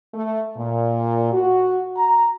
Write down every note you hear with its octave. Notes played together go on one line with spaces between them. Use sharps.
A3
A#2
F#4
A#5